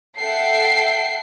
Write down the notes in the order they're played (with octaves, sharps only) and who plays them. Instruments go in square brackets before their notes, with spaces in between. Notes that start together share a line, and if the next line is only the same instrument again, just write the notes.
[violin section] A4 E5 F#5 G5 C7